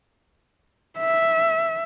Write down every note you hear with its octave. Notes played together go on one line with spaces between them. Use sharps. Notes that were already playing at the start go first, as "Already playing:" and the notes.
E5